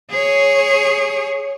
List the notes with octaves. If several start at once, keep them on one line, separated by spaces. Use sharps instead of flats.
G#4 C#5